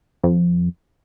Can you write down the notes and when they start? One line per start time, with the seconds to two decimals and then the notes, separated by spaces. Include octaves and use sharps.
0.23 F2